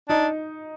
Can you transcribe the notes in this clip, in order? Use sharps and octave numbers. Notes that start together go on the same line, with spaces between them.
D4 D#4